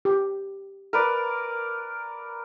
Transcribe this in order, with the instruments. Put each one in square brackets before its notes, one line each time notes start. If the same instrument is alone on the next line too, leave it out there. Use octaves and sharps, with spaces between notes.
[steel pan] G4
[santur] A#4 B4 D5